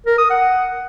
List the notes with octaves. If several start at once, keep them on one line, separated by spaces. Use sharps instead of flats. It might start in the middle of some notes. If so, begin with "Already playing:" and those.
A#4
D#6
F#5